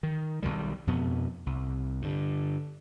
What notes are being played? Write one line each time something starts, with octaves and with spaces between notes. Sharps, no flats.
D#3
B1 E2 D#3 G3
F2 B2 B3
C2
G2 D3